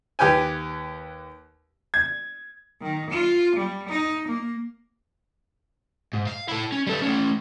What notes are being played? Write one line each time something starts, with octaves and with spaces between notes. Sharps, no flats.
D#2 G4 B4 G5 G#5
G#6
D#3
F4
G3
D#4
A#3
G#2
F5
E4 A4
C#4
G3 A4
A3 C#4